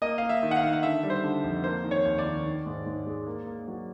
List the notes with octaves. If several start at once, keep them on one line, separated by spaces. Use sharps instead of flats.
A#3 D#5
A#3 F5
E5
D#3
F#5
F5
D#3
F5
D3 E5
G3
C5
D3
F2
A#3 C5
D#3
C#5
D#2
D5
D#3
D#3
G#2
G#2
G#3
A#3
A#3
F#3